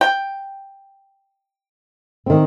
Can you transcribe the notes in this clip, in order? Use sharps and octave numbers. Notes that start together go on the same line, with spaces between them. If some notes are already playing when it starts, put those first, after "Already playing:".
G5
D#3 C4